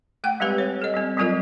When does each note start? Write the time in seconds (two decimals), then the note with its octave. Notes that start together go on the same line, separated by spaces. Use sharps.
0.24 A3 F#5 G5
0.40 G3 G#3 C4 G4 B4
0.58 C#5
0.82 A4 D#5
0.94 G3 C4
1.17 F#3 G3 C4 F4 A#4 D#5